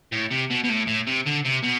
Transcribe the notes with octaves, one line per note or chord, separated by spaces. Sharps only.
A2
C3
B2
B2
A2
A2
C3
D3
C3
B2